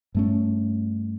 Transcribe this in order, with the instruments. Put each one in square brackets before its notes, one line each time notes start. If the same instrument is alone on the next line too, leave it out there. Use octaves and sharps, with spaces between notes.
[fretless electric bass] G2 A3 C#4